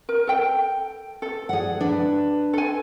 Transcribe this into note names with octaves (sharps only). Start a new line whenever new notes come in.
A#4
A4 G5
A4
G#4 D5 F#5
D4 B4
A4 G#5